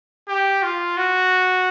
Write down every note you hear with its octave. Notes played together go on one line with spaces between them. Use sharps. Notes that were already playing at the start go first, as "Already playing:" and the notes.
G4
F4
F#4